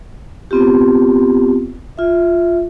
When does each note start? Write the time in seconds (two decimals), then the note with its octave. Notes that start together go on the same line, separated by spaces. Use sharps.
0.51 B3 C4 F4 G4
1.97 F4 E5